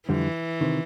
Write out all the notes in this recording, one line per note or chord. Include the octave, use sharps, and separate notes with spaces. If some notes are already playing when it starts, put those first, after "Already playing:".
F2 D3 E3 G3
C3 D#3